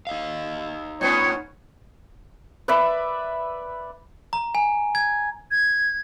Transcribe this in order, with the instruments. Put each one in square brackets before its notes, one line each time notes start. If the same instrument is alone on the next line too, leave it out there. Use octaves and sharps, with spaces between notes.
[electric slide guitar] D#4 D#5 F5
[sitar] A2 B3 C#4 [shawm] C#5
[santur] B4 D5 E5 B5
[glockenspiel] A#5
G#5
G#6
[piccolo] G#6